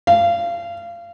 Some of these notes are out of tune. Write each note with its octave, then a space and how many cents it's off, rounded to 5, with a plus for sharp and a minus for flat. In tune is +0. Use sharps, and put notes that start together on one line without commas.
F5 -25